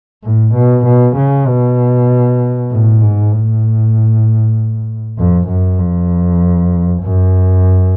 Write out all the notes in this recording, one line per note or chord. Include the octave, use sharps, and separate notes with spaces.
A2
B2
B2
C#3
B2
A2
G#2
A2
F2
F#2
F2
F#2